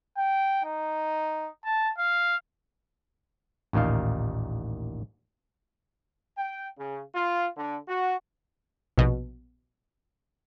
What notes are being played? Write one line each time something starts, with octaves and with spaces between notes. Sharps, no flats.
G5
D#4
A5
F5
A1 D#2 A#2 D#4 F5
G5
C#3
F4
D3
F#4
A#1 B2